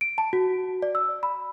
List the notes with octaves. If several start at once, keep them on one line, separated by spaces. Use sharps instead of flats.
D7
A5
F#4
D5
E6
B5